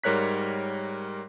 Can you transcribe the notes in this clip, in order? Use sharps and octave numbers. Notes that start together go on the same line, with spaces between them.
G#2 G3 A#4 C#5 F#6 B6